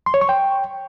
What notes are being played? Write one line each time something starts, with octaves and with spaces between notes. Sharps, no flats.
C6
C#5
C#6
G5